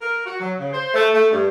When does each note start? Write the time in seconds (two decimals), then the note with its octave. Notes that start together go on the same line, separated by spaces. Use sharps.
0.01 A#4
0.26 F#4
0.40 F#3
0.59 C#3
0.72 C5
0.94 A3
1.14 A3
1.31 G2